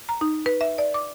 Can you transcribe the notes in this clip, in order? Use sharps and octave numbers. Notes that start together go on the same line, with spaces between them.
A#5
D#4
B4
E5
D5
D6